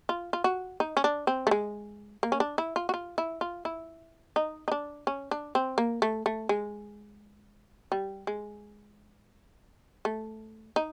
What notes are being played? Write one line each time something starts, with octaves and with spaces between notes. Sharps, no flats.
F4
F4
F#4
D#4
C#4
D4
C4
A3
G#3
A#3
C#4
D4
E4
F4
F#4
F4
E4
F4
E4
D#4
D#4
D4
C#4
D4
C4
A#3
A3
A3
G#3
G3
G#3
A3
D#4